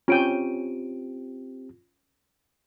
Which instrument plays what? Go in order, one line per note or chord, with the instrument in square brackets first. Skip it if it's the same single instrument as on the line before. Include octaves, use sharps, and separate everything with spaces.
[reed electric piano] C4 G4 [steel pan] C#4 G5 [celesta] F4 D7 D#7